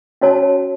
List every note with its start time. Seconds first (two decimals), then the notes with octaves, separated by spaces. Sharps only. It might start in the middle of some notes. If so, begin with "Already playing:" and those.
0.21 C#4 F#4 C#5 A5